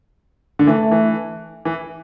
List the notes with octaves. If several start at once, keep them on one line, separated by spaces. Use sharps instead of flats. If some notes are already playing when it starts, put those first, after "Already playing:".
D3
E3 A3
E3
E3